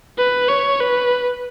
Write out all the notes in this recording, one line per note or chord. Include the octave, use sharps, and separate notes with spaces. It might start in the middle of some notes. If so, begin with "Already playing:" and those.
B4
C#5
B4